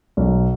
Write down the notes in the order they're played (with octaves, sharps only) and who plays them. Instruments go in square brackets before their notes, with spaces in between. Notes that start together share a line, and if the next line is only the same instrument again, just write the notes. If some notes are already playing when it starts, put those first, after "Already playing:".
[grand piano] B1